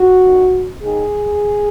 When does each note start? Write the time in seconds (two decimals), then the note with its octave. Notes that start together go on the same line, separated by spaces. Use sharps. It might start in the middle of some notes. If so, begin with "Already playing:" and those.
Already playing: F#4
0.22 F#2 D#3
0.82 D#2 D#3 G#4